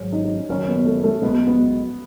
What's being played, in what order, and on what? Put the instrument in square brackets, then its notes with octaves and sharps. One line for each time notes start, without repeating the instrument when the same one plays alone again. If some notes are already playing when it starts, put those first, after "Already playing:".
Already playing: [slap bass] G#1 G#2 F#3
[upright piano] D#4
D#4
C#4
[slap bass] F#1 F#2 D#3 [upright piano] C#4
[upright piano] B3
A3
A3
[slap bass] B1 B2 G#3 [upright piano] B3
[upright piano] B3